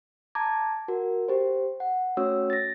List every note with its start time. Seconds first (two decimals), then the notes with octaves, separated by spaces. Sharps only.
0.35 A5 A#5 D6 G#6
0.88 F#4 A#4
1.28 G4 C5
1.80 F#5
2.17 A3 C#4 F#4 C#5 E6
2.50 A6 A#6